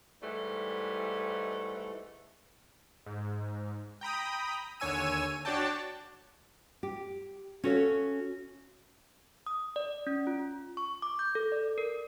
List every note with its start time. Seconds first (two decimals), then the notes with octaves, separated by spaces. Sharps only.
0.23 G#2 E3 G3 A3
3.06 G#2
4.01 G5 A#5 B5 D#6
4.80 D#2 D3 C#5 G#5 E6 D#7
5.45 D4 F#4 C#5 D5 G5 A5
6.83 G4
7.64 C#4 F#4 A4 B4 C#5 F5
9.46 D#6
9.76 D5
10.07 C#4
10.27 F4
10.77 C#6
11.02 D6
11.19 G6
11.35 A4
11.52 D5
11.78 A#4